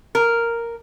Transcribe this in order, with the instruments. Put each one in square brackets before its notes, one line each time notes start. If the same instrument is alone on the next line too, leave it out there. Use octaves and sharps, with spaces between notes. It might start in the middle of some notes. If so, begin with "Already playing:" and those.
[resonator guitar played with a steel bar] A#4